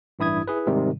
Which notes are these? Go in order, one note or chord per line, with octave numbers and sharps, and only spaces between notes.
A1 G2 E4 D#6 G#6
E4 G#4 B4
G#2 C3 D#3 G3